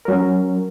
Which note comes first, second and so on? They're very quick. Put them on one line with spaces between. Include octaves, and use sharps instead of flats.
A#4 F#3 C#4